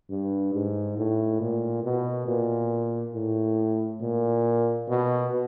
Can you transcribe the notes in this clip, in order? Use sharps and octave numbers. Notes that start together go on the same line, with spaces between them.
G2
G#2
A2
A#2
B2
A#2
A2
A#2
B2